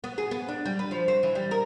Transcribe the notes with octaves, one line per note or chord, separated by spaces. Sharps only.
B3
G#4
B3
D4
G3
B4
F3
C4
E3
G3
A#4